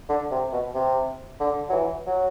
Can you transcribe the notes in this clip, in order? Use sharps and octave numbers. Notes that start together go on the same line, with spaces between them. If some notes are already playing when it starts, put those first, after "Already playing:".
D3
C3
B2
C3
D3
F#3
E3
F#3